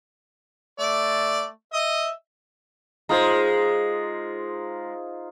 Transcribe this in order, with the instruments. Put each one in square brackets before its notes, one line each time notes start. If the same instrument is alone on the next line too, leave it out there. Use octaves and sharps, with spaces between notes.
[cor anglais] A3 [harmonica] D5
[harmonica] D#5 [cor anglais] E5
[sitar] G#3 [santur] D#4 F4 C5